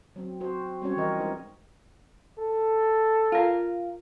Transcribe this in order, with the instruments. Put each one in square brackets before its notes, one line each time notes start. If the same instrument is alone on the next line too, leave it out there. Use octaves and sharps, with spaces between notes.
[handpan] F#3 C4
C4 F#4 C5
G3 C4 C#4 F#4 C#5
E3 F3 A#4 D#5
G#3 D#4 A#4
[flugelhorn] A4
[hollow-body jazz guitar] F4 A#4